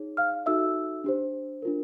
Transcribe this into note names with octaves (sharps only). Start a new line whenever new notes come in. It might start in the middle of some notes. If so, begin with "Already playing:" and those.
Already playing: D#4 G#4 C#5
F5 F6
D#4 F#4 A4 E5 E6
D4 G4 C5
D4 F4 A#4